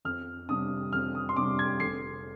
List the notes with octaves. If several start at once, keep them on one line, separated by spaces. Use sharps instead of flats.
F2 F6
C3 G3 D4 D#6
F2 F6
D#6
C6
C3 G3 D4 D6
G#6
F1 C7